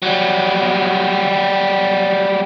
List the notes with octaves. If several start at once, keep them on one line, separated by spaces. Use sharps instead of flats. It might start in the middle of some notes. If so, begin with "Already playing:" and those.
F#3 G3